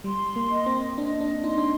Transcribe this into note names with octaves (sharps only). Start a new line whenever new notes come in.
G3 C6
A#3
D#5
C4
D4 D#5
D4
D#4 C6
D4